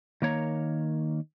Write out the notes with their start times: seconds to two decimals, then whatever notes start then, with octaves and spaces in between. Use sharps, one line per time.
0.22 D#3 A#3 C#5 A#5